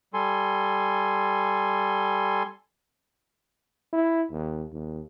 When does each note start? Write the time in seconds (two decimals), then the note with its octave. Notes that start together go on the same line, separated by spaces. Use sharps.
0.14 G3 A4 G#5 C6
3.93 E4
4.31 D#2
4.73 D#2